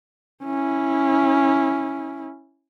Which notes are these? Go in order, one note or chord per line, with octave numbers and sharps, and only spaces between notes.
C#4 E4